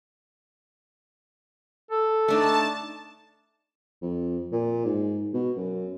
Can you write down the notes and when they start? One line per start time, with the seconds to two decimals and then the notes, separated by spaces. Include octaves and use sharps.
1.91 A4
2.28 A3 D4 D#4 A5
4.02 F2
4.52 A#2
4.85 G#2
5.34 B2
5.56 F#2